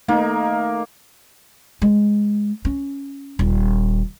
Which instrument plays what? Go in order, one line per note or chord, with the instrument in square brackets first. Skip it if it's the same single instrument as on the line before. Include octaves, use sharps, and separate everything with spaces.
[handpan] A3 D#4 [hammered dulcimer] A#3
[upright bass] G#3
C#4
D#1